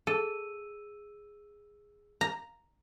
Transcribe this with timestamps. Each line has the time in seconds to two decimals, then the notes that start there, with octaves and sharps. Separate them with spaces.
0.07 G#4 A4 E6 D#7
2.21 A#5